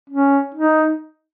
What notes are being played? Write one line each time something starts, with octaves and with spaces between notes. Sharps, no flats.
C#4
D#4